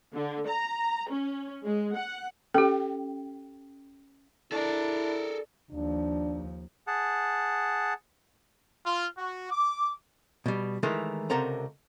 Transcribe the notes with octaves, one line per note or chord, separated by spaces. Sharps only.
D3
A#5
C#4
G#3
F#5
C#4 G4 A4 G5
D4 E4 A4 A#4
D#2 F3 D4
G#4 F#5 A5
F4
F#4
D6
B2 G3
D#3 E3 G#3 A3 A#4
C#2 C3 A4 A#4 F#5 A#5